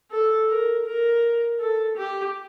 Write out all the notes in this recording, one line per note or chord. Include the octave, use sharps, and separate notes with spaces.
A4
A#4
A#4
A4
G4